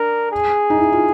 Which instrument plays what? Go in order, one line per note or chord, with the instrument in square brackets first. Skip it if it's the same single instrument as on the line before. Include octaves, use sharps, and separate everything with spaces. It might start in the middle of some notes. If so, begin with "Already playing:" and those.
Already playing: [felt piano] D4 [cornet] A#4
[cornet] G#4
[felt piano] D#4
E4
F4